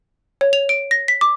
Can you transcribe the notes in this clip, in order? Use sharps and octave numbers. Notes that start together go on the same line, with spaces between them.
C#5
F7
D7
A#6
B6
D6